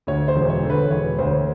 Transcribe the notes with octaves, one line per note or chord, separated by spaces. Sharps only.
D2 C#5
C5
E1
C#5
D3
B4
E1 C#5
D2 C5